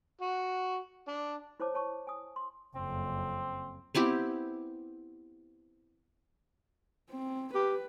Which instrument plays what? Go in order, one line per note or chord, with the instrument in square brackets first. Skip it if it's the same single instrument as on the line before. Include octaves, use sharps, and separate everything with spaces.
[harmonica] F#4
D4
[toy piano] E4 C5 C#5 A5 D6
C#5 A5 C#6
G#5 D#6
C6
[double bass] F#1 F2 [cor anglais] C4
[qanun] B3 C4 E4 G4
[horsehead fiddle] C4
[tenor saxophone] G4 [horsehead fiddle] B4